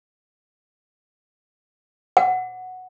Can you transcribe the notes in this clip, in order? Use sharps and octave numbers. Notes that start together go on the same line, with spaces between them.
F#5